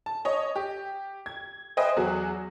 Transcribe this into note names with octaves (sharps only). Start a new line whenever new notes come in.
A5
C#5 D#5
G4
G#6
B4 C5 D#5 E5 G5 G#5
E2 F#3 F#4 G#4